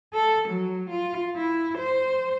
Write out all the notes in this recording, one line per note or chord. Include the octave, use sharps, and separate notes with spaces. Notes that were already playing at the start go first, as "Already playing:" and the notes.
A4
F#3
F4
E4
C5